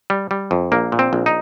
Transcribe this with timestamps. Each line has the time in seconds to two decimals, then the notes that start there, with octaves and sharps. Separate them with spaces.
0.10 G3
0.31 G3
0.51 F2
0.72 A#1 A#3
0.92 A#2
0.99 C4
1.13 A#1
1.26 D#4